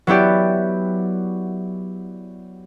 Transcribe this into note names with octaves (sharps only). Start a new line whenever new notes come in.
F#3 B3 E4 G4 D5